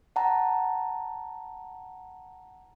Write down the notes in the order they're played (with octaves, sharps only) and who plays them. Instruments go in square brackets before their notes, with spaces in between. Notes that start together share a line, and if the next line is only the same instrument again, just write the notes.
[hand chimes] F#5 A5 A#5